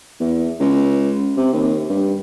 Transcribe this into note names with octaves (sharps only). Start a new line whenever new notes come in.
E2
C#2
C3
D#2
G2